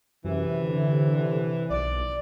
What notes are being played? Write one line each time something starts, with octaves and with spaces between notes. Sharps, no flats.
F#2 C3 E3
D3
B1 D5